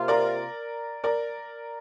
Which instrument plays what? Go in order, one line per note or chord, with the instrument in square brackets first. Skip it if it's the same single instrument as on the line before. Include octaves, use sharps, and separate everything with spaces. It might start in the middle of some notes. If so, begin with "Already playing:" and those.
Already playing: [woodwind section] C3 A#3 F4
[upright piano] A#4 D5
A#4 D5